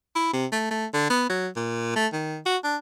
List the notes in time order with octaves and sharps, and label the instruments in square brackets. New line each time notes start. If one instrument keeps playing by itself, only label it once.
[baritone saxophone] E4
C3
A3
A3
D3
B3
F#3
A#2
A3
D#3
F#4
D4